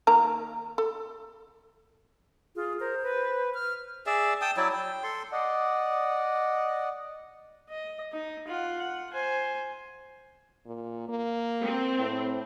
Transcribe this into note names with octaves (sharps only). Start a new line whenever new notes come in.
D#3 A#3 A#5
A4
F4 G#4
A#4 C5
B4
F6
G#4 D5 E5
G5 A5 D#6
F#3 E4 D5
G5
A4 C6
D5 D#5 F#5
D#5
D#4
F4 F#5
F#5
C5 G#5
A#2
A#3
C4
A2